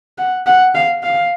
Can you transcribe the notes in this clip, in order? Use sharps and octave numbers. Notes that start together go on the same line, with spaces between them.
F#5
F#5
F5
F5